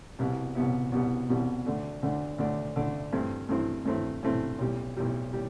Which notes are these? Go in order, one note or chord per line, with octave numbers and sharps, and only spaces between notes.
C2 B2 G3 B3 E4
C2 B2 G3 B3 E4
C2 B2 G3 B3 E4
C2 B2 G3 B3 E4
D2 D3 A3 D4
D2 D3 A3 D4
D2 D3 A3 D4
D2 D3 A3 D4
G2 E3 A3 C4 E4
G2 E3 A3 C4 E4
G2 E3 A3 C4 E4
G2 E3 A3 C4 E4
B1 A2 G3
B1 A2 G3
A2 G3